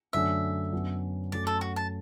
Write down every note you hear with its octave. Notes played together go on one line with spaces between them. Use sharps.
F#2 D3 F#3 A3 D4 E5
F#2 F#3 B3 D4
F#2 F#3 A3 D5
A4
F#4
A5